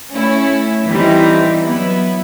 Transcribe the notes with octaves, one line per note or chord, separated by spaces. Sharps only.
A3 C#4 E4
E3 G3 C4 D#4 G4
F#3 B3 E4